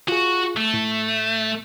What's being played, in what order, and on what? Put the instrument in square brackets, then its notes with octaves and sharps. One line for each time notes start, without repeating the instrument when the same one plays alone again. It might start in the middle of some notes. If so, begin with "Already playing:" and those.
[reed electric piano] F4 G#4 [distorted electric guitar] F#4
[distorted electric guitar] A3
[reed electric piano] A2